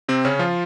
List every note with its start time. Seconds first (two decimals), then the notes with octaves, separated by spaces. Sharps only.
0.08 C3 C4
0.25 C#3 C#4
0.39 F3 F4